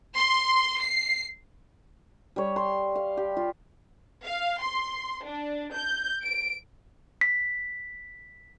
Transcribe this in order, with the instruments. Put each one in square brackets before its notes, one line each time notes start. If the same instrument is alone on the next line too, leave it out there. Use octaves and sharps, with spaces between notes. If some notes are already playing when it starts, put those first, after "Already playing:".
[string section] C6
C7
[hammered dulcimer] G3 C#5
C6
F5
G4
F4
[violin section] F5
C6
D4
G6
D7
[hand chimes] B6